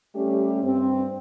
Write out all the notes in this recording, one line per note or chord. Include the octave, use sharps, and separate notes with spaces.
G3 A3 C#4 G4
G2 C4